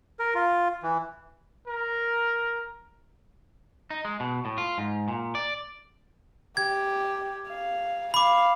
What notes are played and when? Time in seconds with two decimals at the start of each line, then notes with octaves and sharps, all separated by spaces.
0.19 A#4
0.35 F4
0.83 E3
1.67 A#4
3.90 D#4
4.05 G#3
4.20 B2
4.45 A2
4.58 F4
4.78 G#2
5.08 A#2
5.35 D5
6.57 G4 G#6
7.48 F5
8.14 F5 B5 D6